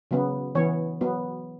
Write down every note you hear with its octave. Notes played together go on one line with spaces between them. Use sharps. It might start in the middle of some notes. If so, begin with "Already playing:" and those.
C#3 F#3 B3
E3 B3 C#5
F#3 B3